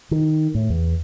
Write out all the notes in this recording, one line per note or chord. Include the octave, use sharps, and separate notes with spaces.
D#3
A2
E2